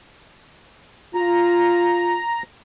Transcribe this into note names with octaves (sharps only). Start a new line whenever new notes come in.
F4 A#5